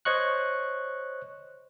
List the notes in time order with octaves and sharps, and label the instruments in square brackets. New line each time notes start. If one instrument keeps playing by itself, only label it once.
[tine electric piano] C5 C#5 D#5 C#6 F#6